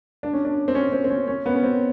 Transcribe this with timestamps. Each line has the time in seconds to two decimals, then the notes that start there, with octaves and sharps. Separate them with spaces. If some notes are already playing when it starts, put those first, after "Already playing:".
0.23 D4
0.33 C#4
0.45 D4
0.68 C4
0.75 C#4
0.92 C4
1.04 C4
1.10 C#4
1.28 C#4
1.46 B3
1.55 C#4
1.64 C4